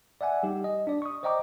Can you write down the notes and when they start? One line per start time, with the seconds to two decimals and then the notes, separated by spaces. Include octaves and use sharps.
0.21 D5 E5 F#5 G#5
0.43 G3 D#4 G4
0.64 D#5
0.87 D4 D5
1.02 C#6 D#6
1.23 C5 D5 D#5 G5 A#5 D6